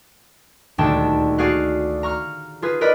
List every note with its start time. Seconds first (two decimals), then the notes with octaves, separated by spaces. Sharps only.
0.78 D#1 D2 D4 G5 A5
1.38 F#4 G#4 D5 F5 F#5
2.03 A#5 C#6 F6
2.62 F4 G#4 B4
2.81 A#4 B4 D5 D#5 B5